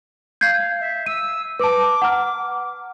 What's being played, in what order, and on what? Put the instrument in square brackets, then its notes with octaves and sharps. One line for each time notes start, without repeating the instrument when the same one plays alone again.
[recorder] F5 [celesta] G6 G#6 C7
[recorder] E5
[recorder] E6 [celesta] D#7
[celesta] B4 A5 [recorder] D6
[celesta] F#5 A#5 F6